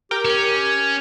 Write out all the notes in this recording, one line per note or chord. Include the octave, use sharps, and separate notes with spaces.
G4 A#4 G5 D6
C#4